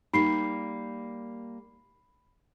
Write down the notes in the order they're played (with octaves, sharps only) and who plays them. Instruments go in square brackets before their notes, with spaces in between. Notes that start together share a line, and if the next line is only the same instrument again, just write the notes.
[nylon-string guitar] G3 A#3 G4 [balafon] D#4 [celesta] B5 C7